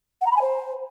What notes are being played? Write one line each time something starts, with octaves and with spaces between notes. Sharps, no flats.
F#5
A#5
B5
G#5
C5